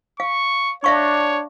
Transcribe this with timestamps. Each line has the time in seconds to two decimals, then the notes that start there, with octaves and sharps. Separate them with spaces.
0.20 F5 C#6
0.84 D4 C#5 E5 F5 C#6